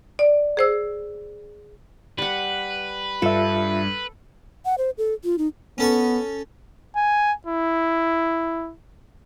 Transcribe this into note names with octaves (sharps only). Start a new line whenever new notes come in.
D5
G#4 C5 E6
G3 B4 F#5
G2 F4 A4 E5
F#5
C5
A4
F4
D#4
B3 C#4 A4 C#6
G#5
E4